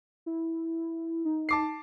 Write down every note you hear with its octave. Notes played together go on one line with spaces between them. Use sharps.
E4
D#4
A5 D6 C7